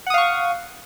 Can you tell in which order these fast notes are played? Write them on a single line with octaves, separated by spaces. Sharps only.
F#5 D#6 F5 C#6